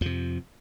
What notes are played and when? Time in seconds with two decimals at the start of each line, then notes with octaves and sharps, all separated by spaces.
0.01 F2 C3 F3